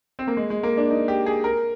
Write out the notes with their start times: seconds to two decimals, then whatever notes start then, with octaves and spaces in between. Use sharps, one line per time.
0.19 C4
0.27 A#3
0.37 G#3
0.50 G#3
0.63 A#3
0.77 D4
0.90 D#4
1.08 G4
1.26 G#4
1.44 A#4